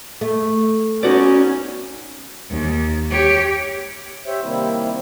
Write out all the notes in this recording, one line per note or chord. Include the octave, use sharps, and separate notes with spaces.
A3
B3 C#4 D#4 F#4 D5
D#2
G4 C#5
G4 C5 C#5 E5
C3 D#3 G3 A#3 C4 E4